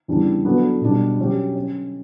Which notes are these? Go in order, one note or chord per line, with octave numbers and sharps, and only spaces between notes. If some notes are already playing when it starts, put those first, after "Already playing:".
E2 C#3 G3 D4
F#3 B3 D4 F#4 A4
B2 G3 D4
F#3 C#4 G4
C#4